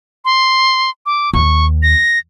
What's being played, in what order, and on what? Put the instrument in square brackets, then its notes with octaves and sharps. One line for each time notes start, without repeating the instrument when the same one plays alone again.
[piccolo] C6
D6
[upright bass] D#2 [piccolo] C#6
[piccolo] A#6